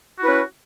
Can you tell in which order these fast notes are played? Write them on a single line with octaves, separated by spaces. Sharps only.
F#4 E4 B4 C#4